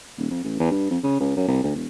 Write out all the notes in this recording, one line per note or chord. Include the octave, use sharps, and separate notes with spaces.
D#1
F2
A1
E2
G2
F2
C#3
C#2
F#2
C2
D2
E1